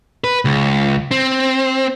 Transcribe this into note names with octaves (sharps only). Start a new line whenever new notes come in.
B4
C#2
C4